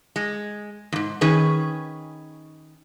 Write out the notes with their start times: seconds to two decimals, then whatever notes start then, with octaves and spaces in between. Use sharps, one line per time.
0.16 G#3
0.92 E2 G#2
1.21 D#3 C#4 G#4 B4